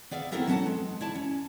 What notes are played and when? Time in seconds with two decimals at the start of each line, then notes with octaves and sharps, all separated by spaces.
0.11 B3 D5 E5 F5
0.32 B3 C4 E4 A4 A#4 E5
0.47 F#3 C#4 A4 F#5 A5
0.66 G#3
1.01 E4 D5 A5
1.15 C#4